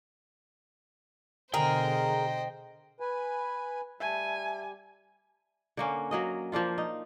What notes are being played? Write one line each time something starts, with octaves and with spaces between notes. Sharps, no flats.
B2 D3 G#4 A#4 C5 D#5 G5
B4 G#5
G3 E5 G#5 A5
D3 A#3 C#4
F#3 A#3 D#5
F3 A#3 D4 F4
D#4